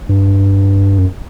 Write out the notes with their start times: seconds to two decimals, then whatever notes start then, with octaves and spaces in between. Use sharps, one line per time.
0.09 G2
0.98 F#2